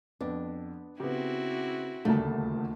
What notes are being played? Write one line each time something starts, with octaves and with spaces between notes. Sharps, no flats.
F2 B3 D4
C#3 B3 C4 E4 F#4 G4
D#1 D2 A#2 C#3 G3 A3 A5